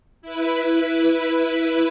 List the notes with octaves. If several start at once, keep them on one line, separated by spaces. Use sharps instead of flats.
E4 B4